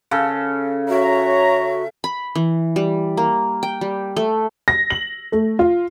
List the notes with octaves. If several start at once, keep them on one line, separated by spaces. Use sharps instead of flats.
C#3 A4
F#4 C#5 E5 A#5
B5
E3
G3
A#3
G5
G3
A3
A#6
F#7
A3
F4